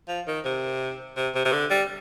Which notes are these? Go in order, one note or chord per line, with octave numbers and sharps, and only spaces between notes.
F3
D#3
C3
C3
C3
C3
D3
G3